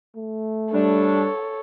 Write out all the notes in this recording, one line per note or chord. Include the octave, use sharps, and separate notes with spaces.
A3
G3 D4 A4 C#5